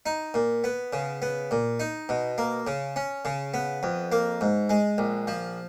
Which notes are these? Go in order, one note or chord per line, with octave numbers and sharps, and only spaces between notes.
D#4
A#2
B3
C#3
B3
A#2
D#4
B2
A#3
C#3
C#4
C#3
B3
F2
A#3
G#2
G#3
A#1
F3